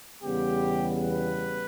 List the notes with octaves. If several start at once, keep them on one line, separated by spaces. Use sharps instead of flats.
E2 C#3 G3 B3 G4
B4